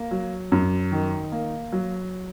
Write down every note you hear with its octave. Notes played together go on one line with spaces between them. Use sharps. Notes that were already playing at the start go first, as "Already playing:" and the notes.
Already playing: A#3
F#3
F#2
D#3
A#3
F#3